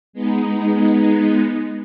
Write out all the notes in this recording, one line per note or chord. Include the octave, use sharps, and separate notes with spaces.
G#3 B3 D#4